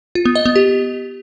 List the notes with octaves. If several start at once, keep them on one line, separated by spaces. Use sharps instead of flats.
F4
B3
D#5
B3
G4